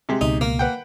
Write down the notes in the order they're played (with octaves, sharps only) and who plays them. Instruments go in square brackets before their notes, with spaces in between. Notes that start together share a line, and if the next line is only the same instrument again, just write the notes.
[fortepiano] C3 G#3 G4
[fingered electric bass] C#2 B2 [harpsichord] D#4
[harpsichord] A#3
[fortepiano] B4 F#5 G5